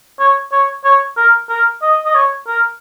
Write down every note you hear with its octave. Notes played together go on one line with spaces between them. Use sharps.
C#5
C#5
C#5
A#4
A#4
D#5
D#5
C#5
A#4